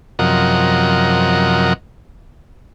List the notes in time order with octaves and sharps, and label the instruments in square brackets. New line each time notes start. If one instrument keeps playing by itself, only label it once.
[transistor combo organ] F#2 C3 F3 A#4 D#5 F#5